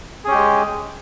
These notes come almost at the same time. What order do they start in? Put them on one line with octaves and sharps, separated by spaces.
G#4 C#4 G4 G#3